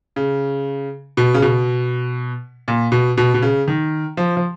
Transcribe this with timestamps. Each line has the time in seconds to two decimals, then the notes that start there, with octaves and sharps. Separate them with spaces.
0.16 C#3
1.17 B2
1.34 C#3
1.42 B2
2.68 A#2
2.92 B2
3.17 B2
3.34 B2
3.42 C#3
3.68 D#3
4.17 F3
4.37 F3